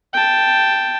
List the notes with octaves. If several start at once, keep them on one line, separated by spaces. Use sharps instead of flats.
G5 A5